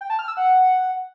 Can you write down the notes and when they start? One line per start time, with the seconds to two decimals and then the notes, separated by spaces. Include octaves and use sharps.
0.01 G5
0.10 A5
0.19 F6
0.28 E6
0.37 F#5